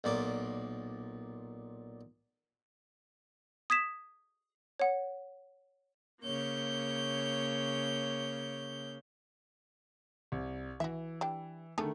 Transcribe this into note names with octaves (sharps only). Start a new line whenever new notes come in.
B1 A#2 D5
D#6 G#6 B6 E7
C#5 F#5
C#3 A#3 C#5 G6
C2
E3 F#4 E5
G3 D4 G5
D3 D#3 A3 D4 G#4 A4